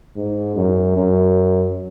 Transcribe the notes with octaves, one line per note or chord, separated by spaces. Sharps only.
G#2
F#2
F#2